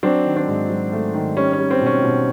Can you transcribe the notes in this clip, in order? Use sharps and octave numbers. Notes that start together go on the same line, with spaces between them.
F#3 C4 D4
D#3
C4 D4
G#2
F#3
A3
D#3
G3 C#4
C#4
G3
C4
B2
C#4
B2